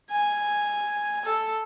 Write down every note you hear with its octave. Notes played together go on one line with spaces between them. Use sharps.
G#5
A4